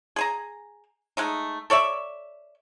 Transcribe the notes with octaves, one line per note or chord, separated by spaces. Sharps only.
G#4 G#5 A#5
G#3 A3 D#4
A4 C#5 D5 E5